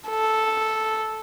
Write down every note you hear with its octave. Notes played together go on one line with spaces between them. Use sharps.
A4